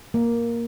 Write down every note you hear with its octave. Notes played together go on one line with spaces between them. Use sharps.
A#3